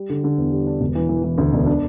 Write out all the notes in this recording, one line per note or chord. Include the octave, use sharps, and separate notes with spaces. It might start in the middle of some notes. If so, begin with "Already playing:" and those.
Already playing: G3
D3
D3
E2
G3
D4
E1
E3
E3
E3
D2
E1
D4